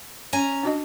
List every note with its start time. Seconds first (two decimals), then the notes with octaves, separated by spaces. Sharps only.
0.33 C#4 G#5 A#5
0.63 D4 F#4 D#5